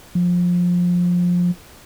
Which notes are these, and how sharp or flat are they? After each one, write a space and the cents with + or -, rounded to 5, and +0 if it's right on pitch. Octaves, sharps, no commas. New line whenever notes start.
F3 +20